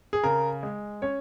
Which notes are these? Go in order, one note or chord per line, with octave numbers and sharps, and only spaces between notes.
G#4
C#3 A#4
G#3
C#4 C#5